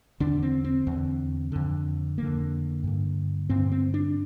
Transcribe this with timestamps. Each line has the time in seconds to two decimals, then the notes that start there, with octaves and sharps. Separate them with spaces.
0.20 E2 D3 D4
0.43 C4
0.64 C4
0.87 E2 D3
1.52 F2 D3
2.18 F2 D3 A#3
2.84 G2 D3
3.49 G2 D3 C4
3.72 C4
3.94 D4